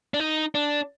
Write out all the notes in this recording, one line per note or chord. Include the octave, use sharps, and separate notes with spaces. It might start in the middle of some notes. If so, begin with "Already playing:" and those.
D4
D#4
D4